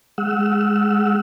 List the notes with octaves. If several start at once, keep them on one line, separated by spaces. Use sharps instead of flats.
G#3 F#5 E6